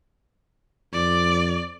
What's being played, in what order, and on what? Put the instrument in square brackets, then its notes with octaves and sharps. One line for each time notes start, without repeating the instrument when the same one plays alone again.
[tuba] F2 [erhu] D5